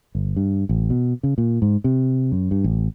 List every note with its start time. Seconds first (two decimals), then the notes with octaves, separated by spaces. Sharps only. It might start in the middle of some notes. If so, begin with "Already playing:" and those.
0.15 G1
0.36 G2
0.69 A1
0.90 B2
1.23 C#3
1.38 A#2
1.62 G#2
1.84 C3
2.32 F#2
2.51 G2
2.64 A1